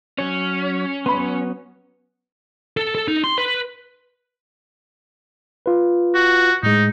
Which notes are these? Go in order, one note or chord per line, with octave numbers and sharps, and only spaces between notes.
F#3 C#4 C#5
F#3 B3 B5 C6
A4
A4
D#4
C6
B4
F4 B4
F#4
A2 G#3 D#4